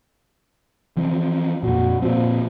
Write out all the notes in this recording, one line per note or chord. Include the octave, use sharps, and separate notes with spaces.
E3 F3 C4
F2 A#2 F#4
A#2 F3 C4